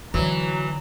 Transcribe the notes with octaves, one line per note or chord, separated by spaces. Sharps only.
D3 E3 F#3 A#5